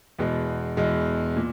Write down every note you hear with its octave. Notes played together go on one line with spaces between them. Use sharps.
E2 B2 G#3
E2 B2 G#3
A#2